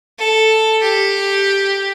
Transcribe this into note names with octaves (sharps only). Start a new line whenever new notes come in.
A4
G4